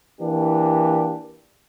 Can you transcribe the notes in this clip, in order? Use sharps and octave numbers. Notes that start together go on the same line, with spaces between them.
E3 A#3 D4 G4